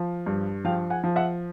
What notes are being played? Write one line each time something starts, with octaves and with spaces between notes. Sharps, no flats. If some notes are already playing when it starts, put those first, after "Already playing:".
Already playing: F3
G2
F3 F5 G5
F#5 G#5
F3
E5 F#5